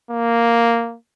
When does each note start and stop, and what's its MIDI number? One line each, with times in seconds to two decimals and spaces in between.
0.11 0.96 58